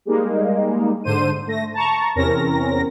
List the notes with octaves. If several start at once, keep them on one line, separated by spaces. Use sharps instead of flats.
G3 G#3 A#3 D#4
G#2 D3 C5 D#7
A3 A#6
A5 A#5 C#6
E2 C3 C4 C#4 A#4 A#6